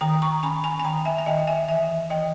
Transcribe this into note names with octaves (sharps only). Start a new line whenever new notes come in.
D#3 G5 A#5
A#5 C#6
C#4 G#5 B5
G#5 B5
G#5
D#3 G5 A#5
E5 G#5
G#5
D#3 D#5 G5
E5 G#5
E3 E5 G#5
E3 D#5 G5